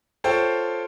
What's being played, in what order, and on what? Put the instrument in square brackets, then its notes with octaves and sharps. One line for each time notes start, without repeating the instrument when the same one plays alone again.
[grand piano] F4 A4 C5 C#5 G5